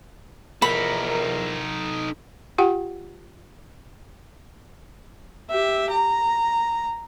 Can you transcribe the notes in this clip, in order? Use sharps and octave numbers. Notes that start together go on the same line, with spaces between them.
E2 F3 D#4 A4 A#4 B5
F4 G4 F#5 G5
G4 E5
A#5